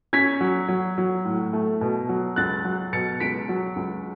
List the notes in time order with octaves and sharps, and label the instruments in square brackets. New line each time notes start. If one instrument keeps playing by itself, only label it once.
[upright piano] C#4 G#6 B6
F#3
F#3
F#3
A2
A3
B2
F#3
C#2 F#6 A6
F#3
B2 A6 C#7
C#2 B6 D7
F#3
C#2